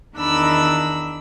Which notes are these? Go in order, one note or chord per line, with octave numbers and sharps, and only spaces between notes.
E2 D#3 D4 B5 E6